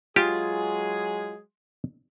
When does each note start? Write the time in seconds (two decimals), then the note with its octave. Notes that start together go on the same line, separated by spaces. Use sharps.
0.16 F#3 G#3 F4 G4 G#4